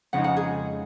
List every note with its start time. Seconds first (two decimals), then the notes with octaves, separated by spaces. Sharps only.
0.13 F2 C#3 G#3 D#4 F#5
0.24 F#5
0.37 G#4